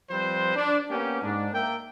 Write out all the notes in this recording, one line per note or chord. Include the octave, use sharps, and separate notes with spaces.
F3 G3 C4 B4 C5
D4
A#3 B3 C#4 G4
G#2 D4
A#3 A#4 E5 G5